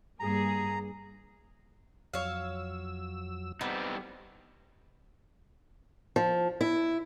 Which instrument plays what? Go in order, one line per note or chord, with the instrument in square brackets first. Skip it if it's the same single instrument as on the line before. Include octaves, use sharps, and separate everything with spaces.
[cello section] G2 A#3 G#4 [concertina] A#5
[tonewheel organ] F2 F#3 E6 [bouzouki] C#5 F5
[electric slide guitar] G3 C4 D#4 [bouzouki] B3
[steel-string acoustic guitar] F3
E4